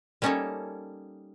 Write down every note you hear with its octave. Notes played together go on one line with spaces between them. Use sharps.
G3 A#3 C#4 D#4 A4 C#5